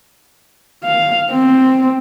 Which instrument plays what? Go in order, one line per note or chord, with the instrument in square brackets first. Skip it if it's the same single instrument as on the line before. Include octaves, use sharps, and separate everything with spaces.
[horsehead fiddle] F5
C4